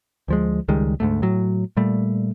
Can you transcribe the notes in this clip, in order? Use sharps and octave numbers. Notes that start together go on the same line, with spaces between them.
D2 F3 G#3
C#2 D#3 G3 G#3
D2 G#2 A3
A2 F#3
A#2 G3 A3